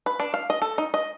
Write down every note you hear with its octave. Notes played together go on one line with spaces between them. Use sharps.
B4
D4
F5
D#5
A4
D#4
D#5